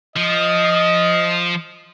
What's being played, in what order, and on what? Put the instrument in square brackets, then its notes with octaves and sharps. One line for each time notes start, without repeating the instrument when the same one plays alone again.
[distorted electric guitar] F3 [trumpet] D#5